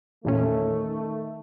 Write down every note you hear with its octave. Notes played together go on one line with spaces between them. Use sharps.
E2 A#2 D#3 A3 C#4